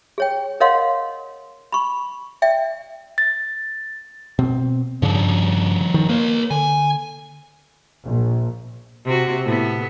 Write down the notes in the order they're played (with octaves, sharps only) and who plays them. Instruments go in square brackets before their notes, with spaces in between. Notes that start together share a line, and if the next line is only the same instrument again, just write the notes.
[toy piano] G#4 C#5 G5
A#4 C#5 D#5 F5 F#5 C6
B5 C#6
D5 E5 G5
[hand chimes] A6
[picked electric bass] B2 C4
[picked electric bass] G2 C#3 [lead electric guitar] F3 G3
[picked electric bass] D#3
[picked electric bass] A#3 [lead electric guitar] B4 C#5
[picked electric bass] D3 [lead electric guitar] G#5
[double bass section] A#1
[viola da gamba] C3 F#4
A2 B3